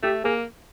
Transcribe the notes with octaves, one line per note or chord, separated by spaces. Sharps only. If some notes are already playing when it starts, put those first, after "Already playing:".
A3 G4
A#3 G#4